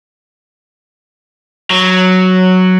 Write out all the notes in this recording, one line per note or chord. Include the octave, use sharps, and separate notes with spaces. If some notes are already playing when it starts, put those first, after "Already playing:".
F#3